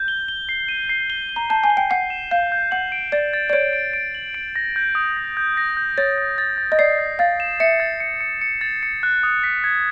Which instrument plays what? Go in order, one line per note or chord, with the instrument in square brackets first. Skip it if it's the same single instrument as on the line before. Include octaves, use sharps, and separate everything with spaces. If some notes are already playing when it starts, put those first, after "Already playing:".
Already playing: [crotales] G6
G7
G7
C7
D#7
C7
G7
G7
[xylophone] A#5
[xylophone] A5 [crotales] G6
[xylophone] G#5
[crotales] G7
[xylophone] G5
[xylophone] F#5 [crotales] C7
[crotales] E7
[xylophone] F5 [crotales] G6
[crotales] G6
[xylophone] F#5 [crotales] F#7
[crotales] D7
[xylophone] D5 [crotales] A6
[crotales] A6
[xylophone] D5
[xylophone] C#5 [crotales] D7
[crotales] D7
D7
F#7
D7
A#6
G6
D#6
A#6
G6
A#6
G6
[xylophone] C#5 [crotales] A6
[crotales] A6
A6
A6
[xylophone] D#5
[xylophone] D5 [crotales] C7
[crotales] A6
[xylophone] F5 [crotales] A6
[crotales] E7
[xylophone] E5 [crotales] C#7
[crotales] A6
C#7
C#7
C#7
A6
C#7
F#6
D#6
B6
G#6